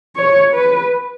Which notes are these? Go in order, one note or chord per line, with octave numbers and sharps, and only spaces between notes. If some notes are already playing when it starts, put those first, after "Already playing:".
C#5
B4